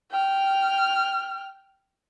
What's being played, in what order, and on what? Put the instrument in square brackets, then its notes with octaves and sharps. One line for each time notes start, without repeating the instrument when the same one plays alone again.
[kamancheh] G5 F6